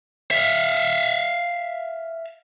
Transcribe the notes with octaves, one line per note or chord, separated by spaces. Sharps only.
E5 F5